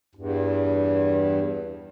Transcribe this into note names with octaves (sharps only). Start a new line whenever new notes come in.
E2 G2